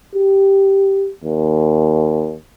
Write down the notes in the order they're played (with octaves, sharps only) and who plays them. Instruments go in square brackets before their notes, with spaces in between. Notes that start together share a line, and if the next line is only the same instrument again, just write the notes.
[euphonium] G4
D#2